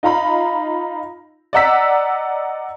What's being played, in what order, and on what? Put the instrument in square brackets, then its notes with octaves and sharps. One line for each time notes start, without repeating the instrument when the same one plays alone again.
[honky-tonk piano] D#4 F4 F5 A#5 B5
D5 D#5 F#5 A#5 E6 B6